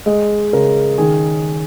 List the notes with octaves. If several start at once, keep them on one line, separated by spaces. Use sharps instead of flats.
G#3 D#5
C#3 A#4
D#3 G#4